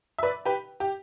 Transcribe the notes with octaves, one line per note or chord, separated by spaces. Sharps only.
E5
B4 D5
G4 B4
G4